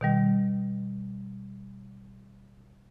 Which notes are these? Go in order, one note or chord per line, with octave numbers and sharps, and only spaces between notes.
B2 D#3 G3